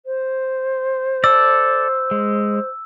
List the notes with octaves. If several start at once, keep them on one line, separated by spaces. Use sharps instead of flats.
C5
A4 D5 E6
G#3